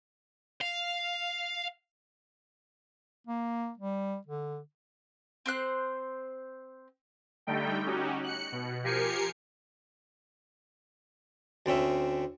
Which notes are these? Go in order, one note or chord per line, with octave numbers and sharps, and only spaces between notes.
F5
A#3
G3
D3
C4 C5 F#6
D3 G3 A3 D#4 G5
C#4 D#4 F#4 G4
F#6 C#7
B2
F3 G4 A#4 G#5 C7 C#7
D2 C4 C#4 E5